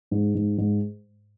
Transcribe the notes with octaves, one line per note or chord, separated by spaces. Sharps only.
G#2
G#2
G#2